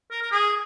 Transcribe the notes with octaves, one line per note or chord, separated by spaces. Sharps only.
A#4
A#4
G#4